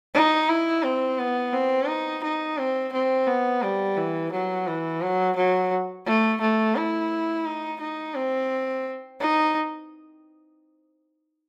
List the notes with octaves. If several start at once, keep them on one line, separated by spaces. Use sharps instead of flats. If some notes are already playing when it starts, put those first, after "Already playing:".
D#4
E4
C4
B3
C4
D#4
D#4
C4
C4
B3
G3
E3
F#3
E3
F#3
F#3
A3
A3
E4
D#4
D#4
C4
D#4